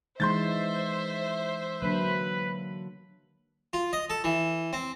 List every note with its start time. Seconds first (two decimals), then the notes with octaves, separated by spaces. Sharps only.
0.20 E3 G#3 D#4 C5 E5 C6 G6 A6
1.82 D3 F#3 A#3 B4 B5
3.73 F4
3.93 D#5
4.10 A4
4.24 E3
4.73 C4